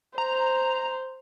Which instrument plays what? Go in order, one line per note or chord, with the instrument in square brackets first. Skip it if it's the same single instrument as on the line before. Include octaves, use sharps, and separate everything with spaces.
[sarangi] C5 [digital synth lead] A#5